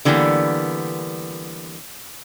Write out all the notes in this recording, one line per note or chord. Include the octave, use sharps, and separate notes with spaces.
D3 E3 G3 A#3 B3